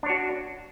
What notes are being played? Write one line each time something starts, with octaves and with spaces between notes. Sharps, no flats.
D4 F#4 C#5